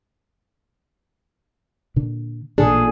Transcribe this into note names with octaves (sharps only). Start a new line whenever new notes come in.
A#2 D3 D4
A1 A#2 D3 D4 G#4 A4